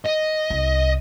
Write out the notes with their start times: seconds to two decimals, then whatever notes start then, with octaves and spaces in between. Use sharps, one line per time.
0.05 D#5
0.50 C2